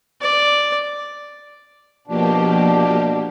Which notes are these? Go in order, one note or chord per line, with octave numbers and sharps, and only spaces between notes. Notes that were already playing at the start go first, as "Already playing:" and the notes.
D5
B2 F3 A#3 D4 G4